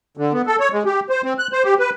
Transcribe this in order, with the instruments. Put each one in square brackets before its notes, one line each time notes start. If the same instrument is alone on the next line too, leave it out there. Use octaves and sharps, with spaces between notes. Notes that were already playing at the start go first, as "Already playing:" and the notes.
[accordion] D3
B3
A4
C#5
G#3
G4
C5
C4
F#6
C5
G4
B4